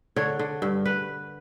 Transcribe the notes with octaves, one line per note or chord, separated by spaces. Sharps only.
D3 C#5
D3
G2
B4